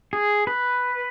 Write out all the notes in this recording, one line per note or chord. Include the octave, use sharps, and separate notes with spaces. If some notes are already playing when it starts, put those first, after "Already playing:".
G#4
B4